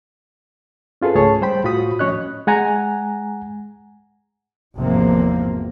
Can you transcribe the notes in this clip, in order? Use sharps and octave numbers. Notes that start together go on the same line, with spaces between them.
C#4 F4 G#4 A4 B4
C#2 G#2 A3 G#4 C#5 A5
G3 C5 G5 B5
A2 F4 F#4 B5 D#6
A2 F3 C#4 C#5 D#5 F#6
G#3 F#5 G#5 A#5
G#1 E2 C3 F3 A#3